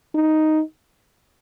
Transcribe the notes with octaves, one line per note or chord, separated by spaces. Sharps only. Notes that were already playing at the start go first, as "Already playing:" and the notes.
D#4